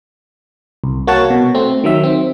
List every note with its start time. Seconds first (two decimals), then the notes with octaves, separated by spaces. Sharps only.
0.84 C2
1.07 A#3 F#4 C#5 F#5 A5
1.30 B2
1.55 A3 C4
1.84 D#3 F#3 E5
2.03 C4